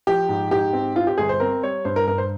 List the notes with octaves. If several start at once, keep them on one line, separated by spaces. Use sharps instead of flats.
F3 G4
G#2
G#2 G4
C4
C4 F4
G4
G1 G#4
C5
C4 A#4
G3 C#5
G2 C5
A#4
G2 A#4
C5